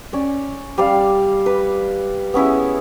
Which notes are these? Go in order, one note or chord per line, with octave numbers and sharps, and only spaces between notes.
C#4 D5
G3 D5 F5
B4
B3 C#4 E4 G#4